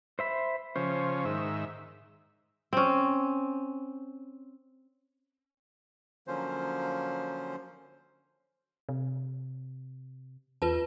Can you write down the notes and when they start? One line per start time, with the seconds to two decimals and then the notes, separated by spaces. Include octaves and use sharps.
0.19 C5 E5 B5
0.76 C#3 F3 C#4 C5
1.25 G#2 D#3 E5
2.73 C4 C#4
6.27 D3 F3 F#3 A#3 C#4 C5
8.89 C3
10.62 E2 F4 B4 A5